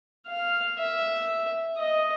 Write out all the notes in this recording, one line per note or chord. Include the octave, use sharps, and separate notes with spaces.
F5
E5
D#5